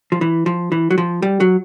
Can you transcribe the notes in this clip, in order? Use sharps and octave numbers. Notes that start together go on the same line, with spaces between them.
F3
E3
F3
E3
F#3
F3
G3
F#3